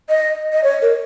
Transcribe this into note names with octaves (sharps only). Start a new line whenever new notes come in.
D#5
D#5
C#5
A#4